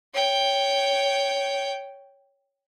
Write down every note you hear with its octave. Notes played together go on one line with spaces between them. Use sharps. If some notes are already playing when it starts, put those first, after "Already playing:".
C#5 G5